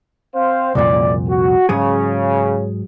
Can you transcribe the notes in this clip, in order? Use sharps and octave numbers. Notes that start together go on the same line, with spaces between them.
C4 C5 F5
F#1 C2 F2 A#2 D5
F#4
G#2 C#3 F#3 G#4